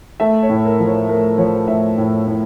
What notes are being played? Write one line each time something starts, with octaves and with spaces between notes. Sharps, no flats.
A3 E5
C#5
A2
A#4
F3
C#5
A3 A#4
F3 C#5
A2 E5
A2
A2